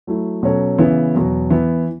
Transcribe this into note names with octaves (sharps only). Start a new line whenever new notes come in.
F#3 A3 E4
B2 F#3 C#4 A4 C#5
C#3 E3 B3 E4
E2 B2 F#3
E3 B3 E4